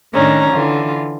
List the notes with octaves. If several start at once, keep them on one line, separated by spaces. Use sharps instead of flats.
A2 D#3 C#4 D4 A#5
D3 E3 F4